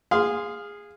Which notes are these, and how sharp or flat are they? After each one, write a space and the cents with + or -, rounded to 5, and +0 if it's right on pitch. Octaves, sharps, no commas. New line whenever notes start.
G#4 -15 F5 +0 C6 -15